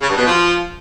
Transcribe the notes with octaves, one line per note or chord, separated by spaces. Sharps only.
C#3
G2
B2
F3